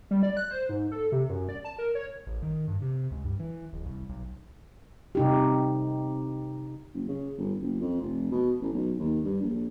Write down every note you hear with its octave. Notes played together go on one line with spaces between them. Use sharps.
G3
D5
F#6
C5
G#2
A4
C3
F#2
D5
A5
A#4
C#5
A1
D#3
G2
C3
C#2
G2
E3
D1
C2
B1
C3 D#4 G4
F#1
C#3
G1
F#1
F2
F1
B2
A1
B1
D#2
G2
A#1